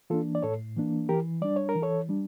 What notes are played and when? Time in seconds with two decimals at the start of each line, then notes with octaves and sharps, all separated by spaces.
0.10 E3 A#3 D4 F4 A4
0.35 D5
0.43 A2 A4 C#5
0.77 E3 A#3 D4
1.09 E3 G4 A#4
1.41 G3 D4 D5
1.56 C#5
1.69 A#4
1.75 E3
1.82 A4 C#5
2.09 G3 D4